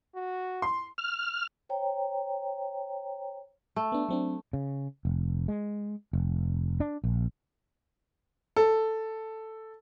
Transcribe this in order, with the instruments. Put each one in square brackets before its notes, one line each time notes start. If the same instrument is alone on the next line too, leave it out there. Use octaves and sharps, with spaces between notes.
[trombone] F#4
[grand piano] C6
[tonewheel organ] F6
[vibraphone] C5 C#5 G5 A#5
[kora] A3
[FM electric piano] B3 D4
F#3 C4 D4
[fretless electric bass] C#3
F1
G#3
F1
D4
A#1
[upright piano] A4